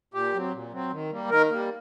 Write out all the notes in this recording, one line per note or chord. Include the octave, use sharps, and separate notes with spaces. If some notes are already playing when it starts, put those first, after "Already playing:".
A#2 G4
F#3 C4
A#2
F#3 C4
D#3
G3 A#3
D#3 A#4
G3 A#3